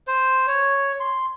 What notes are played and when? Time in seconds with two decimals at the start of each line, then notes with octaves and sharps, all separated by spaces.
0.07 C5
0.47 C#5
1.00 C6